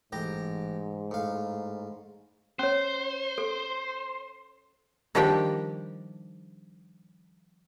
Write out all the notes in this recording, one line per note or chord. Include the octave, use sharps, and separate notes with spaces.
A1 G#2 G4 A#5
A2 F5
C#4 C5 C#5
A4
D#3 F3 G3 D4 G4 G5